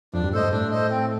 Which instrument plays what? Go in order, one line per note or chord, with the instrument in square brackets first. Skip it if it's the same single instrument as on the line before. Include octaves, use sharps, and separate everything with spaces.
[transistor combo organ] F2 [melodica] D4
[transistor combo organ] G2
[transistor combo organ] A2 [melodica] A4 C5 D#5
[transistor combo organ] G2
[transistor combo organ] A2 [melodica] D4
[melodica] A4 C5 D#5
C4